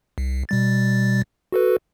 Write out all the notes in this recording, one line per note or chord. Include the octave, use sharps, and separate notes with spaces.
C2
B2 G3 A6
F#4 A4 B4